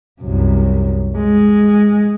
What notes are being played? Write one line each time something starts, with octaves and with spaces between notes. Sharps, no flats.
C2 F#2
G#3